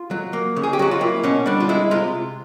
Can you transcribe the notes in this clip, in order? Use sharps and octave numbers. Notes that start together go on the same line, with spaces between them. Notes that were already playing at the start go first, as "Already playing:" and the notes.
Already playing: F4
F#3
A#3
C#3
G#4
G4
F#3 F#4
F4
A#3 E4
B2 C#4
G3 D4
F4
G#3 E4
C3 F4